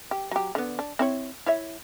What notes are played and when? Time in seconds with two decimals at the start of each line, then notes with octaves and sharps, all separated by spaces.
0.11 G4
0.31 F#3 G4
0.55 D3 B3
0.79 D4
0.99 C4 E4 C#5
1.46 E4 C#5 E5